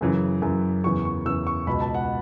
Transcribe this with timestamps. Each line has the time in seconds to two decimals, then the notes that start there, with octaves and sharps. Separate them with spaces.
0.01 F#2 C#3 E3
0.42 F#2 C#3 E3
0.84 E2 C#3 E3 C#6
1.05 C#6
1.26 E2 C#3 E3 E6
1.47 C#6
1.67 C#2 B2 B5
1.81 A5
1.94 F#5